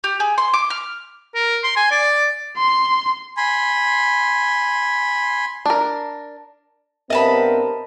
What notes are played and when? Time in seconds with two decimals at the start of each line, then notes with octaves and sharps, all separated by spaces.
0.04 G4
0.20 G#4
0.38 C6
0.54 D6
0.70 F6
1.34 A#4
1.64 C6
1.76 G#5
1.91 D5
2.57 C6
3.37 G#5 B5 C6
5.66 D4 A#4
7.10 G2 B3 C4 A#4 D#5 E5 A5 B5